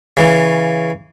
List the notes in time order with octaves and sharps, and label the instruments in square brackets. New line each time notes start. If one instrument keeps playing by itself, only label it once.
[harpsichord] C#3 E3